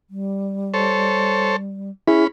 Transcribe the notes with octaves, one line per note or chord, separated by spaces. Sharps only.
G3
A4 C5 C#5
C#4 E4 G#4 B5